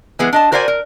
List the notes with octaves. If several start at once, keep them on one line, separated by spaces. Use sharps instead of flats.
E3 G#3 B3 G#4
D4 D#5 A5
F#4 A#4 C5 D5 D#5 G#5
A#4